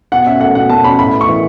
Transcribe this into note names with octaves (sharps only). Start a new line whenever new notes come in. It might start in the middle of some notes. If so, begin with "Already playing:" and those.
B2 F#5
C#4 E5
A3 F#5
B2 F#5
B2 A5
C#4 B5
A2 B5
B3
C#6
E3